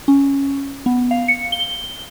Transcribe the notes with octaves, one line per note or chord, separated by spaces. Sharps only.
C#4
B3
F5
C#7
G7